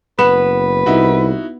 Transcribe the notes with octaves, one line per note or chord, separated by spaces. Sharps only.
F#1 B3 B4 E7
C2 D#4 E4 F#4